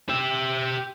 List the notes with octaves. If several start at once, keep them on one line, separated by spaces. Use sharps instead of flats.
G4 E5